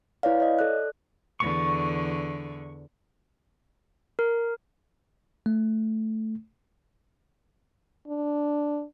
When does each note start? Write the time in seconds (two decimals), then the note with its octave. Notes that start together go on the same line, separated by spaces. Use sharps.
0.23 E4 B4 C#5 D5 F5
0.40 C#5 D#5
0.59 A4 D5 F#6
1.40 E2 D3 C#6
4.19 A#4
5.46 A3
8.08 D4